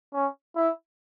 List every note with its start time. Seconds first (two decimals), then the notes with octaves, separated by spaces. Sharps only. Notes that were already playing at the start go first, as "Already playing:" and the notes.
0.13 C#4
0.56 E4